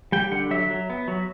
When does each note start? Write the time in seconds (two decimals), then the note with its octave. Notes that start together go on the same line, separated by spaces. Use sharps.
0.12 G3 G5
0.32 D3 F#5
0.51 F#3 E5
0.70 F#3
0.90 B3
1.08 F#3